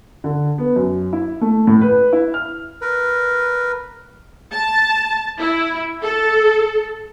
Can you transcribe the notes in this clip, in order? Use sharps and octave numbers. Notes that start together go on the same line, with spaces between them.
D3
B3
F#2
E4
A3
A2
B4
E4
F6
A#4 B4
A5
E4
A4